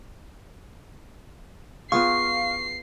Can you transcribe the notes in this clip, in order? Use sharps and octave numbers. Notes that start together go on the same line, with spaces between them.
B3 F4 G#4 F5 C#6 C7